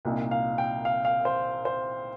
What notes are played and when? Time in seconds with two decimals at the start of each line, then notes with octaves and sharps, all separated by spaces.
0.05 C2 A#2 A#3 D#4
0.31 F5
0.58 G5
0.85 F5
1.05 F5
1.25 C5
1.65 C5